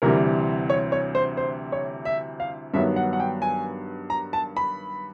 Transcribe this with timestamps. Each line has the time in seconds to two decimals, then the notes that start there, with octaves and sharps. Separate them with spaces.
0.02 D2 C3 E3 G3 A#4
0.70 C#5
0.92 C#5
1.15 C5
1.37 C5
1.72 C#5
2.05 E5
2.40 F5
2.74 G2 D#3 F#3 B3 E5
2.96 F#5
3.13 F#5
3.20 G5
3.42 G#5
4.10 A#5
4.33 A5
4.57 B5